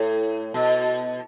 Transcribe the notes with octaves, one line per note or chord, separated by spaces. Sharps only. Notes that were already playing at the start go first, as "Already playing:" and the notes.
Already playing: A2
B2